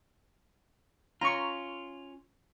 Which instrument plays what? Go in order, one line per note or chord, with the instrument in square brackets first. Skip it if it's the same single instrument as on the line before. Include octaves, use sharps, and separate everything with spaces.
[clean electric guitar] C#4 F4 [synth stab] A#5 C#6